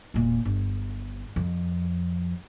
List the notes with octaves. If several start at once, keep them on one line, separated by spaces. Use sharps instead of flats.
E1 A#2
G1
F2